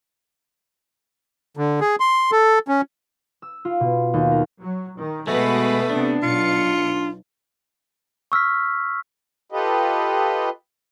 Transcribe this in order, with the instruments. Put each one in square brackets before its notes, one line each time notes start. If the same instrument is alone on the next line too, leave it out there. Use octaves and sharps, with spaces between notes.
[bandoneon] D3
G#4
C6
A4
C#4
[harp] E6
F4
B2
D#2
A#4
[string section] F#3
D#3
[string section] B2 B3 B4 [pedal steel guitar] G#3 F#4 [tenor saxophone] A3
[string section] C3 B3 [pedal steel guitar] D4
[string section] B1 B2 C#7 [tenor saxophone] F4
[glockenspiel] C#6 E6 F6 B6
[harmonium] F4 G4 A4 B4 D#5